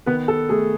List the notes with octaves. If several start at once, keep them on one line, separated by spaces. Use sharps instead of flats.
D#3 B3 B4
A4
A3 G#4